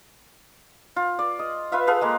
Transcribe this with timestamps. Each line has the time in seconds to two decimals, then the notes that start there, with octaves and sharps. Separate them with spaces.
0.96 F4
1.19 D5
1.39 D#5
1.72 F4 B4 E5 F5
1.87 G#4 A4 B4 F5
2.01 G#3 A#3